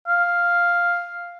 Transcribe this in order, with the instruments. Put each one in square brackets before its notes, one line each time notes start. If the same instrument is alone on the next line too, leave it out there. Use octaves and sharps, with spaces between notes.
[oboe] F5